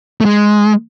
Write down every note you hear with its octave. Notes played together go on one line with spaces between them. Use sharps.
A3
G#3